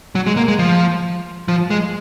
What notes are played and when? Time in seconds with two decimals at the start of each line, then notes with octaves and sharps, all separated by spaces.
0.15 F#3
0.27 G#3
0.37 A#3
0.48 G#3
0.59 F3
1.48 F3
1.70 G#3